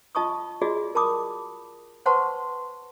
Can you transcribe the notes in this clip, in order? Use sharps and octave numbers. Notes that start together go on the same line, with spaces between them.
F4 D#5 A5 C#6 D#6
F4 F#4 G#4 D5 D#5
A#4 A5 B5 D6 D#6
B4 C5 F#5 A5 C6 C#6